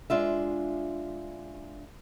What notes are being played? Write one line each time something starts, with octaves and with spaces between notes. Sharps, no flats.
G#3 D4 F4 E5